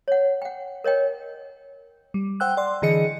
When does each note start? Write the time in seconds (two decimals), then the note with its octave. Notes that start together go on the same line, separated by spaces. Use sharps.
0.08 C#5 F#5
0.42 F#5 G5
0.84 A#4 C#5 D#5 G5
2.14 G3
2.40 C5 F#5 G5 E6 F#6
2.57 D5 C6
2.82 D3 E3 G#4 D#5 C#7